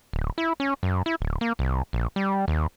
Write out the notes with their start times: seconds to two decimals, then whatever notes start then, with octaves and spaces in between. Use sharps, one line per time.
0.13 D1
0.38 E4
0.60 C#4
0.83 F#2
1.06 E4
1.21 D1
1.41 A#3
1.59 C2
1.93 A#1
2.16 G3
2.48 D#2